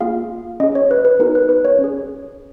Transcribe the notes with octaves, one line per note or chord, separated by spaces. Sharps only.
A#3 F4 G#4 F5
C#4 G#4 D#5
C#5
B4
B4
B3 D#4 F#4 A#4
B4
B4
C#5
C#4
G#4